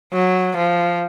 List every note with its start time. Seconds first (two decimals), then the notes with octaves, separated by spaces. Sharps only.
0.13 F#3
0.57 F3